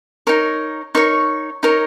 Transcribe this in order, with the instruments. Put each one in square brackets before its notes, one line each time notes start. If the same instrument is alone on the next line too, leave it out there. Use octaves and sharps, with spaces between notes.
[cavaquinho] D#4 A#4 C#5
D#4 A#4 C#5 C#6
D#4 A#4 C#5